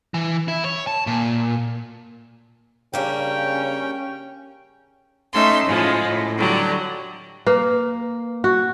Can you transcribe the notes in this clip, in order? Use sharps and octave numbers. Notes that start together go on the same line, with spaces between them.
E3
E4
C#5
A5
A#2
C#3 G3 A#3 C#4 D4 G5
A3 C#4 D#4 E5 C6
A2 C#3 F3 G#3
A2
D3 F#3 G3
A#3 B4
F#4